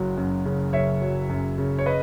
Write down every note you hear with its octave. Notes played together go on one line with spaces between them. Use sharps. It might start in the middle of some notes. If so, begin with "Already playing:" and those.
Already playing: F#1 F#3
F#2
C#3
F#1 C#5 E5
F#3
F#2
C#3
C#5
B4 D#5